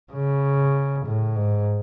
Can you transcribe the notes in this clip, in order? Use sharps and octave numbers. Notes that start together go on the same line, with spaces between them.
C#3
A2
G#2